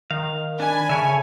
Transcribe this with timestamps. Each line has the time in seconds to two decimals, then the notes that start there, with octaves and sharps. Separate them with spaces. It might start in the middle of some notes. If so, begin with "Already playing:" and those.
0.11 D#3 F5
0.60 D4 G#5 B5
0.89 C#3 A4 C#5 E5